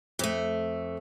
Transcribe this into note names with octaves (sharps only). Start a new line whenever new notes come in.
F2 A3